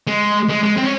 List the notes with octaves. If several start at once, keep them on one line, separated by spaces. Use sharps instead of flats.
G#3
G#3
G#3
C4
C#4